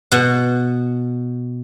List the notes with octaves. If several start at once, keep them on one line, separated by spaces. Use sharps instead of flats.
B2 F#5